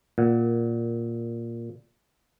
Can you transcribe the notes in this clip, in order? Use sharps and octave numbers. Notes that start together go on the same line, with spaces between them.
A#2 F#5